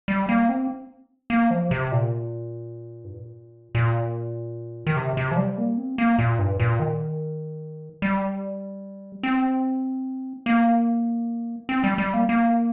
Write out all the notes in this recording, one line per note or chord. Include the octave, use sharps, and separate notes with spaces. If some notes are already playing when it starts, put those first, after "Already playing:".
G3
A#3
C4
A#3
F3
C3
A#2
G2
A#2
A#2
D#3
C3
C3
F3
G3
A#3
C4
A#3
A#2
G2
A#2
D#3
G3
C4
A#3
C4
G3
G3
A#3
A#3